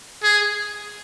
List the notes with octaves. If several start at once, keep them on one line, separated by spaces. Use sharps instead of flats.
G#4